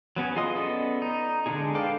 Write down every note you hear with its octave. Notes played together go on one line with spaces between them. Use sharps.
F#3 B3 C#4 G#4
F4 G#4 D#5 C6 D#6
B3 C#4 A4 D5 D#5
D#4
D3 G#3 D4 D#4 G#4
A4 B4 F5 G5 D6